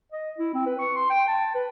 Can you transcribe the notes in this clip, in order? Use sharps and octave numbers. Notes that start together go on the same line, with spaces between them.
D#5
E4
C4
B4
C#6
C6
G5
A5
B4